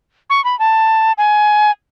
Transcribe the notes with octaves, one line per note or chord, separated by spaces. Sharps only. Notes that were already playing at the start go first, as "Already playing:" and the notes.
C#6
B5
A5
G#5